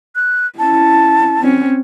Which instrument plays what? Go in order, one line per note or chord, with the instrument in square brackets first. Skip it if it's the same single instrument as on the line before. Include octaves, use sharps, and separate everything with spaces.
[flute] F#6
[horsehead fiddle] C#4 E4 [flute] A5
[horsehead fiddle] C4 C#4